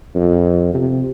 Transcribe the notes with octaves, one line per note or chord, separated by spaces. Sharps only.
F2
C3